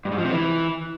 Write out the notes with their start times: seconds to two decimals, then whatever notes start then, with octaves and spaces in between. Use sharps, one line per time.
0.05 G2
0.12 G#2
0.18 F3
0.24 C3
0.31 E3